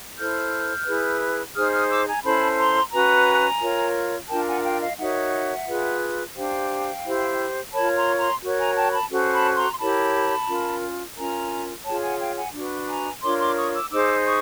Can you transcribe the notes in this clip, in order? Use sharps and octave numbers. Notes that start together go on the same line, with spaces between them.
E4 A4 C5 F6 G6
E4 G#4 B4
D#4 G#4 C5 D#6 F6
D#6 F6
D6 E6
G#5 A#5
C#4 E4 A4 C5 A5 B5
A#5 C6
C#4 F#4 B4 G#5 A#5
F4 A#4 C#5
D4 F4 A#4 G5 A5
F#5 G#5
G#5
F5 G5
D#5 F5
D#4 F#4 A#4 C#5 E5 F#5
F4 G#4 B4
D4 G4 C5 F5 G5
E4 G4 C5
F4 A#4 C#5 A5 B5
A#5 C6
A#5 C6
F#4 A#4 C#5
G#5 A#5
G5 A5
A5 B5
C#4 F#4 A4 C5
A5 B5
A#5 C6
C6
E4 G4 A#4 C#5 A5 B5
C#4 F4 A#4
C#4 F4 A#4 G#5 A#5
F4 G#4 C#5 G5 A5
F#5 G#5
F5 G5
F#5 G#5
D4 F#4 B4
G#5 A#5
D4 F4 A#4 C#5 C6 D6
C6 D6
C#6 D#6
D6 E6
D#4 G#4 C5 D6 E6
C#6 D#6